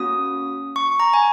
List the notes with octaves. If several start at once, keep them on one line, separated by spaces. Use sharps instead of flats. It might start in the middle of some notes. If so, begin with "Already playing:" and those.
Already playing: A#3 C#4 F#4 D#6
C#6
A#5
G#5